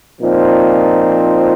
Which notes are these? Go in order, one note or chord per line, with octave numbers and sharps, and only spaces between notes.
A#2 F3 C4 D#4